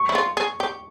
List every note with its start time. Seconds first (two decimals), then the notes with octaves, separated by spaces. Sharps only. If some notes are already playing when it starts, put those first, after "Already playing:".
Already playing: C#6
0.09 E4
0.15 F4
0.37 G#4
0.60 G4